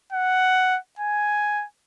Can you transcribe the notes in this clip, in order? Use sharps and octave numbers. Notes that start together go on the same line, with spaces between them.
F#5
G#5